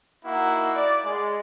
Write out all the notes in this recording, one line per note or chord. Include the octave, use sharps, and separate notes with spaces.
A#3 D#4 E4 F#4 F#5
D5
G#3